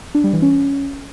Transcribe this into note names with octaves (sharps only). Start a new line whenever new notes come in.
D4
G3
E3
C#4